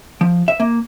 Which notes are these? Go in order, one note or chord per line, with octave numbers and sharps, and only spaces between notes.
F3
E5
A#3